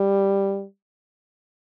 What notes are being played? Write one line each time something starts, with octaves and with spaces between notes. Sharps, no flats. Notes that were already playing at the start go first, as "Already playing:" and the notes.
Already playing: G3